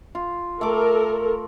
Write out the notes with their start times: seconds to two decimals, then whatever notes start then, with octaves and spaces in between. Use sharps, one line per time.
0.15 F4
0.61 A3 A4 A#4 D6